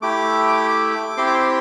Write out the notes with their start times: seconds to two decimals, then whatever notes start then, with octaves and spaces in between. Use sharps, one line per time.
0.02 A3 E4 G4 D6
1.17 C4 E4 G4 C6
1.27 D6
1.34 C6